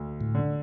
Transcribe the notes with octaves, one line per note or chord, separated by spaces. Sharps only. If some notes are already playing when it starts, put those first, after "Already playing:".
Already playing: D2
A2
D3